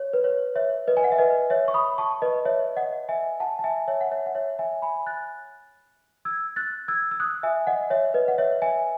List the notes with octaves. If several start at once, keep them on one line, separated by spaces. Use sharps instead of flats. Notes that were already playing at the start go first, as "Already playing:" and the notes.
Already playing: C#5
B4
C#5
C#5 E5
B4 D#5
G#5
F#5
E5
B4 D#5
C#5 E5
C#6
B5 D#6
A5 C#6
B4 D#5
C#5 E5
D#5 F#5
E5 G#5
F#5 A5
A5
E5 G#5
C#5 E5
F#5
C#5 E5
F#5
C#5 E5
E5 G#5
G#5 B5
F#6 A6
E6 G#6
F#6 A6
E6 G#6
E6
D#6 F#6
E5 G#5
D#5 F#5
C#5 E5
B4 D#5
F#5
C#5 E5
E5 G#5